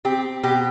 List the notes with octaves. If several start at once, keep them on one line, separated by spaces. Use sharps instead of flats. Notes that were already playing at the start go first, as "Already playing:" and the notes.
C4 G4
B2 G4